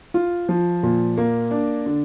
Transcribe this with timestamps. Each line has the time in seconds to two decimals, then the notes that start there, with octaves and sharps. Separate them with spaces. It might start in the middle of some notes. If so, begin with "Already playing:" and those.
0.14 F4
0.49 F3
0.83 A#2
1.17 A#3
1.51 D4
1.86 D3